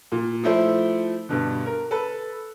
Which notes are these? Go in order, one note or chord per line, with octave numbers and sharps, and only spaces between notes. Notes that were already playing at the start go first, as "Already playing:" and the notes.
A#2
F3 A3 E4 C5
G2 B2 D3
A#4
A4 B4